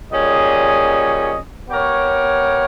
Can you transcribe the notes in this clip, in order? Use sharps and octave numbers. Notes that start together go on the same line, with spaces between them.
A#2 G3 C#4 G#4 D#5
B3 G4 A#4 C#5